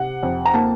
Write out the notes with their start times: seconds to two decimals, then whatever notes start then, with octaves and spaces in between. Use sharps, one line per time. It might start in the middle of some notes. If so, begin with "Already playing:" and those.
Already playing: C3 F#5
0.23 F2
0.45 A#5
0.54 A#3 A5